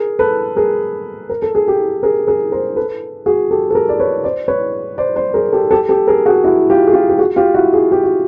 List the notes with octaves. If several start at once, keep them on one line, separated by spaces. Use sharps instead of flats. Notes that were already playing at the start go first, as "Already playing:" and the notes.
Already playing: G#4 A#4
A4 B4
G#4 A#4
A#4
A4
G#4
G4 A4
G#4 A#4
G#4 A#4
A#4 C5
A4 B4
F#4 G#4
G4 A4
A4
G#4 A#4
D5
B4 C#5
C5 D5
B4 C#5
C5 D5
C5 D5
G#4 A#4
G4 A4
G4 A4
G4 A4
G#4 A#4
F#4 G#4
E4 F#4
F4 G4
G#4
F4 G4
G4
F#4 G#4
F4 G4
E4 F#4
F#4 G#4
G4
F#4